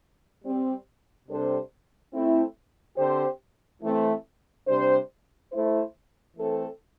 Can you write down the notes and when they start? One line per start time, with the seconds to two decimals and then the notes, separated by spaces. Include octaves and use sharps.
0.44 G3 C4 G4
1.29 C3 G3 D4 A4 C5
2.13 A3 C4 E4
2.98 D3 C4 G4 C5
3.83 E3 A3 C4
4.68 C3 G3 D4 C5
5.53 A3 E4 C5
6.37 E3 A3 C4 A4